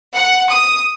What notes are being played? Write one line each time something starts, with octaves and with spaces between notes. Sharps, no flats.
F#5
D#6